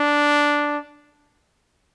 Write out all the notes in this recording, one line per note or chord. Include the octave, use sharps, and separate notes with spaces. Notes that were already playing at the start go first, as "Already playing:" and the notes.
Already playing: D4